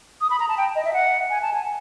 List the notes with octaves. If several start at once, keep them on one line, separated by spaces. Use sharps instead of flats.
D#6
B5
A#5
A5
G5
D#5
E5
F#5
G#5
A5
G#5